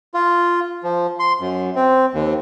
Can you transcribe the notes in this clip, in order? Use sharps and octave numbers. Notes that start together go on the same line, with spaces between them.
F4
F3
C6
F#2
C4
D#2